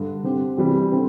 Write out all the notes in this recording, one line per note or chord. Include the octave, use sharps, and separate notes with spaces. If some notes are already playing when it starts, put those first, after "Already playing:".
Already playing: G2 D3
D3 C4 G4
C3 E3 G3
D3 C4